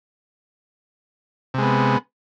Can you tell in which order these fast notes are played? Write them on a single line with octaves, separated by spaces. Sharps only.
C3 G#3 B3